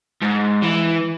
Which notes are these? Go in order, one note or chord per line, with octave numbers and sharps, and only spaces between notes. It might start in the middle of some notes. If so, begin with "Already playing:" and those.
G#2
E3